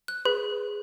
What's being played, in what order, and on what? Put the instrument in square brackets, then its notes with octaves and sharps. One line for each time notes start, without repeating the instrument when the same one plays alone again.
[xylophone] F#6
[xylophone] G#4 [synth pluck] B4